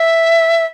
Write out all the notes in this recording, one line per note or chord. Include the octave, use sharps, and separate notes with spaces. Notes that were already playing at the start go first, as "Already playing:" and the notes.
Already playing: E5